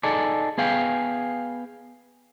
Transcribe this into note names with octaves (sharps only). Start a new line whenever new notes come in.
D#4 G#4 A4 D5
B3 G#4 F5 G5